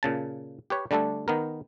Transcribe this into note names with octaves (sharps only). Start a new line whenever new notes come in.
A#2 C#3 A5
G4 B4 C#5
D3 G3 A3 D4 A4
D#3 B3 A#4